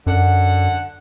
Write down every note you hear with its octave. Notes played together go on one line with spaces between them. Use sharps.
F#2 D3 F#5